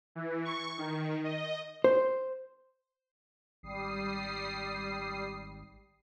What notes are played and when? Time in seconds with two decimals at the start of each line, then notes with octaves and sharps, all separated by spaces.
0.15 E3
0.45 C#6
0.78 D#3
1.24 D#5
1.84 C5
3.63 G#1 G3 D#6 C7